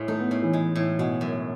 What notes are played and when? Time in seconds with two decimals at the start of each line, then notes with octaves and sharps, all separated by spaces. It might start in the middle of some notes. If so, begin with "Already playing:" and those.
Already playing: A2 G#3
0.08 A3 D#4
0.19 B3
0.31 A2 C#4
0.43 E3
0.53 G#3
0.76 A2
0.98 B2 G#3
1.21 F#2